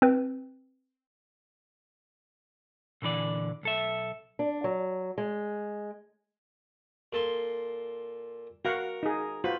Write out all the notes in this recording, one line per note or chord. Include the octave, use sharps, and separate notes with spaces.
C4 B4
A#2 D3 E3 D5
B1 A4 E5
D4
F#3
G#3
A#2 A4 C6
F#4 A#4 F5 F#5
D#4 G#4
F4 F#4 B4 C5